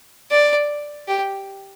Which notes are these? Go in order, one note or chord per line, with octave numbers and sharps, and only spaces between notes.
D5
G4